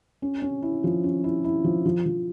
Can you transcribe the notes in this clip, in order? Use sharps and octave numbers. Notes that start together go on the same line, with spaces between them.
C#4
C#4
E4
F3
C#4
E4
E4
F3
F3
F3